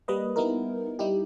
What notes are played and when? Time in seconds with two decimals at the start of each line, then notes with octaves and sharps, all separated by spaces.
0.08 G3 A#3 B4 D#5
0.36 G3 B3 D#4 E4 A#4
0.99 G3 D#4 E4 G4